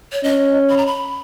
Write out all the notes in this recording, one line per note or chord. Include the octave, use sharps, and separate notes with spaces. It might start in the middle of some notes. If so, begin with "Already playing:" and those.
C#5
C#4 D#5
B5
A#5
B5